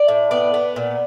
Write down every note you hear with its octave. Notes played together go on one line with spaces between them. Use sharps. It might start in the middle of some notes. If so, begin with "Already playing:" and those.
Already playing: D5
A2
B3 D5
B3
A#2